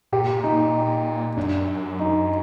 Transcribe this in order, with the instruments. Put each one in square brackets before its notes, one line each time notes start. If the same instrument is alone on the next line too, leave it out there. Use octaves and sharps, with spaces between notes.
[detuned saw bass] A#2 [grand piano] G4
[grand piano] D#4
[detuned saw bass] F#2 [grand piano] D4
[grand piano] D#4